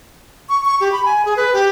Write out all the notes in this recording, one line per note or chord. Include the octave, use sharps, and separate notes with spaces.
C#6
C#6
G4
B5
G#5
G#4
B4
G4